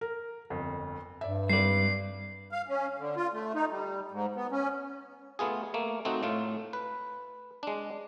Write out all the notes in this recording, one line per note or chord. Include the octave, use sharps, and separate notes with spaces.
A#4
G1 F2
G2 D5 E5
G#1 G3 B4 D5 C7
F5
C#4
D3
F4
A3
D#4
G3
G#2
B3
C#4
A3 B3 F4 G#4
A3 A#3
A3 C4 D#4 F#4
A2 A3 F4
B4
G#3 D4